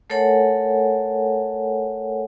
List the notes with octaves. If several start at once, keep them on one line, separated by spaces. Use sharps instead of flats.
A3 A4 A#4 C#5 F#5 G#5